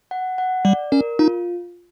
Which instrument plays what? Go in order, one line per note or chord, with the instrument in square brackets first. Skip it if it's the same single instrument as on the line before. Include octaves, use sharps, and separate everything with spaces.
[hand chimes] F#5
F#5
[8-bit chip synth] G3 [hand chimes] D5
[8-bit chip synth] C#4 [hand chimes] A#4
[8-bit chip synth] D#4 [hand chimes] F4